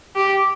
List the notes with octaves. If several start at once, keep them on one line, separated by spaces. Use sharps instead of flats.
G4